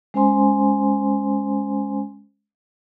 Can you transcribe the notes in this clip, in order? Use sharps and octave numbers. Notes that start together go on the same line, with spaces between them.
G#3 C#4 C5 G#5 C6